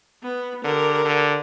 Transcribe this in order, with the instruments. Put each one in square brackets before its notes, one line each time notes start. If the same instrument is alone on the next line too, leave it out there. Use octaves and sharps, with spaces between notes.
[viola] B3
[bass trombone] D3 [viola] G4 A#4
[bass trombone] D3